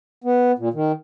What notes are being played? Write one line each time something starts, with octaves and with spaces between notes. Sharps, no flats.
B3
A#2
D#3